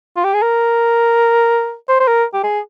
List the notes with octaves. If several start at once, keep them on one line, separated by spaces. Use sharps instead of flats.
F4
G4
G#4
A#4
C5
C5
A#4
G4
G#4